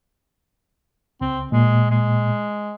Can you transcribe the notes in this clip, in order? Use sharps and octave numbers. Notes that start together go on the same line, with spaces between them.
C#2 C4
A#2 G#3
G#3